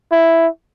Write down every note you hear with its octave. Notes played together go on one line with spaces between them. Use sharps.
E4